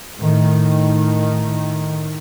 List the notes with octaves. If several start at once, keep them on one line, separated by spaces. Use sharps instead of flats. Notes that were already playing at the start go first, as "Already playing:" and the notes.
A2 D#3